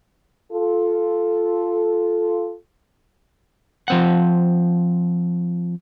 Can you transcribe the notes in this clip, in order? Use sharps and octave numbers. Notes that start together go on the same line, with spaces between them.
F4 A4
F3 C4 F#5